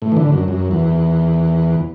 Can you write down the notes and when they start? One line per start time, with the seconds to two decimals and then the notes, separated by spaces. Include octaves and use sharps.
0.02 A2
0.12 E3
0.17 D3
0.32 F#2
0.48 F#2
0.71 E2